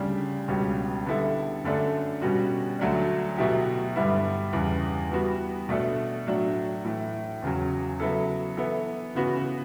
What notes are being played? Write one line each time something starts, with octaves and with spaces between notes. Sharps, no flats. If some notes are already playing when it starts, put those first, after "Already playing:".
Already playing: D2 C#3 G3 D4
C#2 B2 G3 C#4
D3 G3 B3 E4 A4
F#2 D3 A3 D4 A4
B2 G3 C#4 F#4
D2 D3 F#3 A3 D4
B2 F#3 A3 E4 G4
G2 D3 G3 B3 E4
E2 C#3 E3 G3
E3 G3 B3 F#4
B2 A3 D4 A4
A2 F#3 A3 D4 F#4
A2 E3 A3
E2 C#3 F#3
C#3 F#3 B3 E4 A4
E3 B3 E4 A4
C#3 E3 B3 F#4